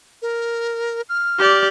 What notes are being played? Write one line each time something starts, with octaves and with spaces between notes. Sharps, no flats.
A#4
F6
G4 D5